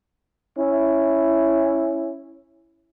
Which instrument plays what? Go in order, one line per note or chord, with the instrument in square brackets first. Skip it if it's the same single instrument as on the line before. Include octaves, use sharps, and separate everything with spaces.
[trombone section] C#4 E4